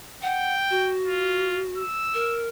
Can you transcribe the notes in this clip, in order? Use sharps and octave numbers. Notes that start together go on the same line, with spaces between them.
F#5 G5
F#4
F4
E6
A#4